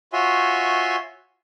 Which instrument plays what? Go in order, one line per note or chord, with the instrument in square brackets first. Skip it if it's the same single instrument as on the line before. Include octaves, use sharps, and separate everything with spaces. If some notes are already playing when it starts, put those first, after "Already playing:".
[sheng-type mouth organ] F4 F#4 C#5 E5 G#5 C6